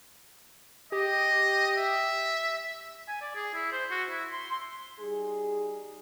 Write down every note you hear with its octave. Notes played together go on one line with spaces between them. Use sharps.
G4 D#5
E5
G#5
D5
G#4
E4
C5
F#4
E4
C6
C6
G3 D#4 G#4